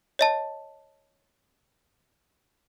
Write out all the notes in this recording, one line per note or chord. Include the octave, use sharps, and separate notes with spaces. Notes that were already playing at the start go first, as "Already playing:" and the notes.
C#5 D#5 A5